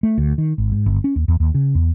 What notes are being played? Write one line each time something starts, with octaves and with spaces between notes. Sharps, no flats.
A3
D2
D#3
G#1
G#2
G1
C#4
D#2
E2
D#2
C#3
E2